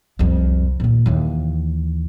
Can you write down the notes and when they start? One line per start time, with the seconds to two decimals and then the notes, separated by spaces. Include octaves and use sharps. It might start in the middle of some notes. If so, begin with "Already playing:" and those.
0.19 C2 F2
0.80 D#2 A#2
1.06 D#2 E3